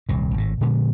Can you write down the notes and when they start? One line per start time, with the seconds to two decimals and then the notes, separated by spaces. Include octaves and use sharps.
0.09 D#1 C2 A#2
0.34 G#1 A2
0.61 A#2 D3 G#3 B3